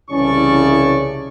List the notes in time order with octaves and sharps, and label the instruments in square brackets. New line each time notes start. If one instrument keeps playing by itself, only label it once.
[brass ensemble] C2 C#3 E3 [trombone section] C#4 [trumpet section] D5 A5 C#6